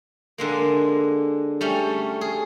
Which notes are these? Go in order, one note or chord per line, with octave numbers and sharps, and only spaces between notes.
D3 G#3 A#3
G3 A3 C#4
G#4